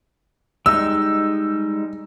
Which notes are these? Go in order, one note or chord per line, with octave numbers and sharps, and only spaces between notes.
G3 G#3 D#4 E6